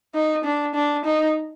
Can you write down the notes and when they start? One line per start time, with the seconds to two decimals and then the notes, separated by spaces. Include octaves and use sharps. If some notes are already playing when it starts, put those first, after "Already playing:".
0.15 D#4
0.44 D4
0.75 D4
1.05 D#4